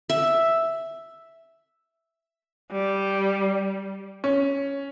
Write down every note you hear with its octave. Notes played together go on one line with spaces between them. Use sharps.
E5
G3
C#4